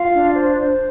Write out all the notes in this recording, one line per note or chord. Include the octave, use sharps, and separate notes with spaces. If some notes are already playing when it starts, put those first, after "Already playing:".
Already playing: F4 F5
D4
C5
C5